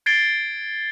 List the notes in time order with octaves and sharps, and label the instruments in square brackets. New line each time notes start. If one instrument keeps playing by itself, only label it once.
[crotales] G#6 A6 C7 D7 G7